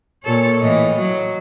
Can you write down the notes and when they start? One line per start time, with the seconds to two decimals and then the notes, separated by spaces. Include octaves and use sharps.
0.24 A#2 A4 C#5
0.62 A2 E3 D#5
0.95 F#3